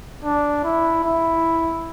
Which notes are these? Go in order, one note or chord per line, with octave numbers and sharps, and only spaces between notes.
D4
E4
E4